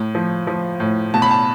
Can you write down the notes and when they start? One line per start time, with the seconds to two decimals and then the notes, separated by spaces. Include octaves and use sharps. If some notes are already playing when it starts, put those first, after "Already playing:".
Already playing: A2
0.15 F3
0.47 F3
0.80 A2
1.14 B2 A5
1.22 B5
1.31 A5